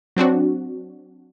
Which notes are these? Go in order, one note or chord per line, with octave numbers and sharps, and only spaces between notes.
F#3 C4 D4 F#4